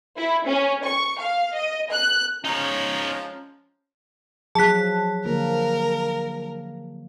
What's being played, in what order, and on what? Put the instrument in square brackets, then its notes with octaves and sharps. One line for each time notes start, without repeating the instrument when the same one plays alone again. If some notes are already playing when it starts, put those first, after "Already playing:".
[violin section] E4
C#4
C#6
F5
D#5
F#6
[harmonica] F3 G#3 A#5 [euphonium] C#4 [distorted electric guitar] D#4 C#5
[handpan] F3 F#3 [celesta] G#4 B6 [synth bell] A5 F#6
[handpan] D3 F3 A#3 [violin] A#4